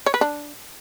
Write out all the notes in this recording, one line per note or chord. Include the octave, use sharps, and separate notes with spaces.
C#5
B4
D4